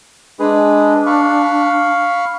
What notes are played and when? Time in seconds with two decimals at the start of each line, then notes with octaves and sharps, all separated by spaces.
0.39 G#3 D4 G#4 B4
1.06 F5 B5 C#6